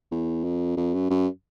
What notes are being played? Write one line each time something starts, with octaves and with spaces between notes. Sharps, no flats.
E2
F2
F2
F#2
F#2